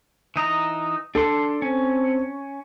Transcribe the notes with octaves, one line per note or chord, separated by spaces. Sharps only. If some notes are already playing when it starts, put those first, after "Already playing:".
E3 D#4 A#5
D4 A4 C6
C4 C#4